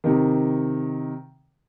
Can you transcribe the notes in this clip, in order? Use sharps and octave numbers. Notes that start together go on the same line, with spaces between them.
C3 D#3